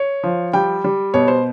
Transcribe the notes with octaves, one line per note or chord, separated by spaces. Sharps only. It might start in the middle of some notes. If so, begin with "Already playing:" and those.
Already playing: C#5
F3
G3 G5
G3
B2 C#5
C5